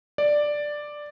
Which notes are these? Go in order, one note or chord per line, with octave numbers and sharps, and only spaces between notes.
D5